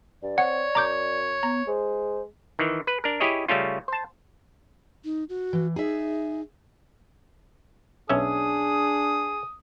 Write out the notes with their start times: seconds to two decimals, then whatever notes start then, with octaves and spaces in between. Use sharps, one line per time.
0.22 G2 D5
0.38 C4 C#5 F#5
0.75 F#2 A#5 D6 G6
1.43 B3 A#5
1.67 G#3 C5
2.59 D#3 E3
2.87 B4
3.04 D4 A#4
3.20 E4 G4 G#4 C#5 D#5
3.48 C#3 G3 A3 C#4 F4
3.88 C5 A5
5.05 D#4
5.29 F#4
5.53 E3
5.76 D#4 G#4 E5
8.09 B1 C#4 D4 G#4 E5 D#6